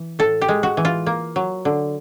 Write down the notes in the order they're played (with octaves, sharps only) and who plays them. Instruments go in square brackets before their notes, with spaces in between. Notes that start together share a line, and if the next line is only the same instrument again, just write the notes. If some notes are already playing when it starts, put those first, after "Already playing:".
Already playing: [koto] E3
A2 A4
G4
G#3
F#4
E3
F4
A#3
F#3
D3